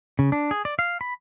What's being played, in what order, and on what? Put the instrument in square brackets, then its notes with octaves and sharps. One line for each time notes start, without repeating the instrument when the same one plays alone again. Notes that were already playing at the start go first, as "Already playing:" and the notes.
[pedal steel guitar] C#3
D4
G#4
D5
F5
B5